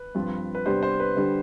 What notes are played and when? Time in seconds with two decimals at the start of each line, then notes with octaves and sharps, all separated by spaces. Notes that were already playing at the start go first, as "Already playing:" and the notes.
Already playing: B4
0.15 G2 F3 C4 F4
0.55 B4
0.66 C3 G3 B3 D4 G4 C5
0.83 C5
1.00 B4
1.16 D3 G3 D4 G4